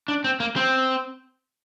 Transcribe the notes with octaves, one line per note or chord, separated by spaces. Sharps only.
D4
C4
A#3
C4